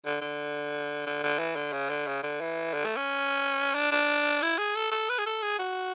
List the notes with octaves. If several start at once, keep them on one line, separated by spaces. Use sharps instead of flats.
D3
D3
D3
D3
E3
D3
C#3
D3
C#3
D3
E3
D3
A3
C#4
D4
D4
E4
G#4
A4
A4
B4
G#4
A4
G#4
F#4